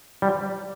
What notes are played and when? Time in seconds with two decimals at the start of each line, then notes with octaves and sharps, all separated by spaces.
0.22 G3